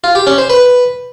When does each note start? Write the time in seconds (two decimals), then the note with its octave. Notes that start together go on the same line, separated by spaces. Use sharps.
0.04 F4
0.15 G4
0.27 C#4
0.38 C5
0.50 B4